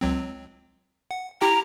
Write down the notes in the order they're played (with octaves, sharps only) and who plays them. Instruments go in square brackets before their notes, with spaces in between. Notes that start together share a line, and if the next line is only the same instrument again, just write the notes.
[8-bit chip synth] C#2 F#3 C4
F#5
[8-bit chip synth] E4 G4 G5 [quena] A#5